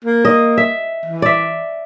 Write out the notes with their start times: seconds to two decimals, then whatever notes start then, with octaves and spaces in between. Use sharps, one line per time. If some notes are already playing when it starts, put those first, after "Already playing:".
0.04 A#3
0.25 D#5
0.57 E5
1.05 E3
1.22 D5 E5